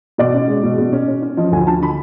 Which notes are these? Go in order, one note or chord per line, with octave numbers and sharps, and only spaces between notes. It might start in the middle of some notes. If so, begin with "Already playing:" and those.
B2 D5
C#4
G#3
B2
B2
C#4
C#4
C#4
F3 D#5
D2 G#5
D3 A5
D3 B5